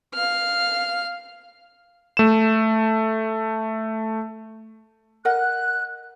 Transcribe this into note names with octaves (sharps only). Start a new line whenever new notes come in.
F5 F6
A3 E7
A#4 D#5 F#5 F#6